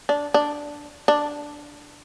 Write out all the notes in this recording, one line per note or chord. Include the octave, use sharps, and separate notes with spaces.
D4
D4
D4